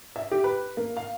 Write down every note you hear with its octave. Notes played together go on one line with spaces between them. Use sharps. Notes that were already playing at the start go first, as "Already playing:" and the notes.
E5
G4
B4
A#3
F5